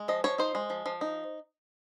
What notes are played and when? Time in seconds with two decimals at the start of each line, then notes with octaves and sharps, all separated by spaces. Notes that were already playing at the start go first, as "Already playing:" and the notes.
Already playing: G#3
0.08 F3 D#5
0.24 F3 C#5
0.38 D#4 C5
0.55 G#3
0.70 F3
0.86 F3
1.01 D#4